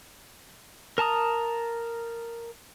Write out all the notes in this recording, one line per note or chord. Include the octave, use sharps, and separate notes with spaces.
A#4 A5 A#5 D#6